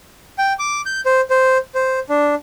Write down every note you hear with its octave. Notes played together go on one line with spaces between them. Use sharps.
G5
D6
G6
C5
C5
C5
D4